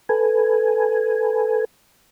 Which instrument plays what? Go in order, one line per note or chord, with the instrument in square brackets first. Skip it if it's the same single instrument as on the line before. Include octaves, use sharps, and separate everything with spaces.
[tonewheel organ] A4 B4 G#5